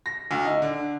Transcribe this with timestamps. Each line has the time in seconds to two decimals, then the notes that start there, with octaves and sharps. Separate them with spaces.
0.06 A#6
0.31 D2
0.45 D#4
0.62 D3